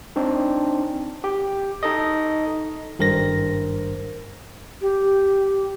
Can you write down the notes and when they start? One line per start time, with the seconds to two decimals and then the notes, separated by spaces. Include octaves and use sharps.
0.16 C4 D4 D#4
1.24 G4 G5
1.83 D#4 A4 D#5
2.99 G#1 G2 A#4 C5 A#6
4.81 G4